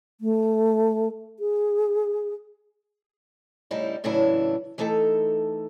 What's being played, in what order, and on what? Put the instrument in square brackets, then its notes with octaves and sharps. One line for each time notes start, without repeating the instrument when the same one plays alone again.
[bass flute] A3
G#4
[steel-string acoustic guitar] A2 C#3 G3 D#4 E4
A2 C#3 E3 F#3 D4 E4
E3 A3 D#4 A4 G5